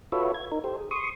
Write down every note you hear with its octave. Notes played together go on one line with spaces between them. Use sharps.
F4 F#4 A4 B4 C#5 E5
G#6
D#4 A#4
G4 A4 C5
G#4
C6 C#6 D#6